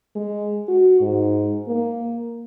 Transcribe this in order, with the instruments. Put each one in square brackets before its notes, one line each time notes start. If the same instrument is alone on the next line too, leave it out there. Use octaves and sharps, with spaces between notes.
[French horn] G#3
F#4
G#2
A#3